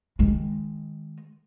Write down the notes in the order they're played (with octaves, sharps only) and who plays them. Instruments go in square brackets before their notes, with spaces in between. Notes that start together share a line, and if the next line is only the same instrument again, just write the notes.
[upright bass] D#3 G#3